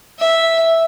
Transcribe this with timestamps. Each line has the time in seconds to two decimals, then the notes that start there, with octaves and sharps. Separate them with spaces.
0.19 E5